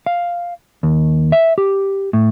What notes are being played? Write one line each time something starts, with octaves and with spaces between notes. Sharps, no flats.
F5
D#2
E5
G4
A2